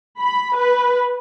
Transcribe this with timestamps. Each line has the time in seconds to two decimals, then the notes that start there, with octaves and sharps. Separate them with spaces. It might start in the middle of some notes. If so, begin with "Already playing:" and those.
0.20 B5
0.57 B4